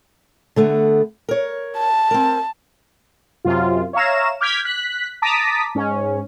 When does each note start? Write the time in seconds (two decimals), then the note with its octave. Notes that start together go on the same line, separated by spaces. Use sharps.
0.56 D3 A3 B3
1.29 A#4 C#5
1.77 A5
2.11 C4 A#4
3.45 F#2 C3 F4
3.93 C#5 E5 F5 A#5 E7
4.41 D6 F6 G6 G#6 B6
4.65 F#6 B6
5.22 A5 A#5 D6 D#6 B6
5.75 G#2 C#4